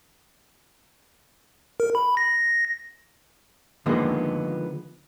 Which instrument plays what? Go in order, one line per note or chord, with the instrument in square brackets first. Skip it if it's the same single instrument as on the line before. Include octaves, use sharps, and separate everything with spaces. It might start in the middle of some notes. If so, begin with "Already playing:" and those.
[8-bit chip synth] A#4
B5
A#6
[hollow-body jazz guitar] D3 D#3 F3 G#3 A#3 B3